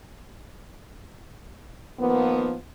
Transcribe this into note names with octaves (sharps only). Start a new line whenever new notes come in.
D#3 F3 A#3 B3